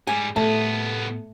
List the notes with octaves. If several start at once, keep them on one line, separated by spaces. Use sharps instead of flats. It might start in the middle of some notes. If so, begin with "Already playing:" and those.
G#2 G3 G#5
C2 A2 A3 B3 A5